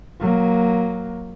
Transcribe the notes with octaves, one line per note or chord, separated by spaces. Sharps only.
F#3 A#3